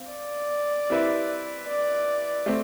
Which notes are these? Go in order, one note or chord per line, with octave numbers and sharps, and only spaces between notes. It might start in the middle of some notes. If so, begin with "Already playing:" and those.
Already playing: C4 F5
D5
G3 C4 E4 B4 E5
D5
A3 C4